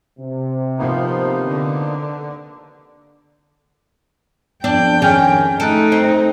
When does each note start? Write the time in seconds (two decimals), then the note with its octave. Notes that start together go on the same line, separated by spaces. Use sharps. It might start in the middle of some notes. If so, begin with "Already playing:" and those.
0.19 C3
0.78 F3 A#3 B3 D#4
1.45 D3
4.64 F2 B3 D4 D5 G5
5.02 D#3 C#4 D4 G#4 G#5 F6
5.60 A3 D#4 A4 F#6 D7
5.92 C4